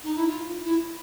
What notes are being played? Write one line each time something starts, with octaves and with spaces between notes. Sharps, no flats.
D#4
E4
F4
E4